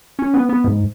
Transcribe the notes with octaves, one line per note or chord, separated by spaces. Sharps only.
C#4
B3
B3
G#2